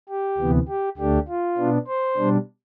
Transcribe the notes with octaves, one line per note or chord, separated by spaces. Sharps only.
G4
D2 C3 E3 B3
G4
D2 D3 A3 D4 G4
F4
B2 B3 D4
C5
B2 G3 D4